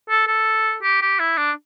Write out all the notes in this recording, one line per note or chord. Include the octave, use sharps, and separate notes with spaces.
A4
A4
G4
G4
E4
D4